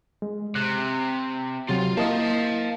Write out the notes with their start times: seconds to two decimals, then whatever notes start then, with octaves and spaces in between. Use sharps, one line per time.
0.22 G#3
0.55 C3 F#6
1.69 C3 F#3 F4 G4
1.97 A#3 E4 D#5 F5 A5